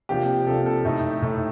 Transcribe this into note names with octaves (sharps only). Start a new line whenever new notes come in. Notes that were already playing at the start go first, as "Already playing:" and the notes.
C3 F3 A#3 D4 G4
C3 F3 A#3 D4 A4
A4
A2 A3 D#4
A2 A3 D#4